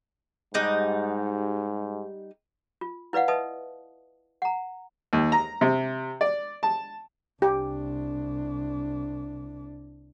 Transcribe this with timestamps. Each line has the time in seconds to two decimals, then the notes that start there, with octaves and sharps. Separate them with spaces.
0.54 G#2 G3 D#4 F#5
2.81 F4
3.13 E4 B4 D5 F5 F#5
3.28 B4 D#5 E5 A5 D#6
4.42 F#5 A#5
5.13 D#2
5.32 A#5
5.61 C3
6.21 D5
6.63 A5
7.42 C2 D4 G4